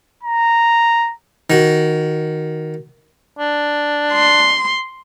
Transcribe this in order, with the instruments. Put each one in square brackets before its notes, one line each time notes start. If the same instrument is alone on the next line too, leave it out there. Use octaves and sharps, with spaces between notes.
[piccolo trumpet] A#5
[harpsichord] D#3 F#4
[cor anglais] D4
[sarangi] C6